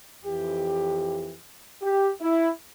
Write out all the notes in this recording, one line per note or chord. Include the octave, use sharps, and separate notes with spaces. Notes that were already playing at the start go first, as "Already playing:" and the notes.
F2 E3 G4
G4
E4